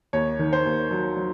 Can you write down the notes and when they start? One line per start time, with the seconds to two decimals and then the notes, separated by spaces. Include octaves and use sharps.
0.13 D#2 C#5
0.39 D#3
0.53 C5
0.65 D#2
0.91 F#3
1.16 F#3